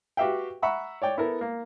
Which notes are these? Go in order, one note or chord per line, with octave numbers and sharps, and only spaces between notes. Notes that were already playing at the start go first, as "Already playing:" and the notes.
F#4 G4 B4 E5 F5 G5
E5 F#5 A#5 B5 C#6 E6
C#5 D5 G5
B3 E4 A4 A#4
A#3